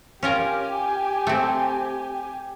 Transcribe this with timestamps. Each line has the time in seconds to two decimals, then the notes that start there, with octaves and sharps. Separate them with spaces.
0.23 C#4 F4 G4 A#4 G#5
1.27 A3 C4